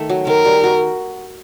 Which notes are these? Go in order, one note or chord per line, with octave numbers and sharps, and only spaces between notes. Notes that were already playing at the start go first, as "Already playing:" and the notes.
Already playing: D#3 A3
F#3
D#3 A#4
G3
F#4